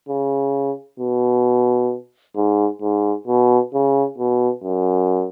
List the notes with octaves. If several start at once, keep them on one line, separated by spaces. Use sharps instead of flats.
C#3
B2
G#2
G#2
B2
C#3
B2
F#2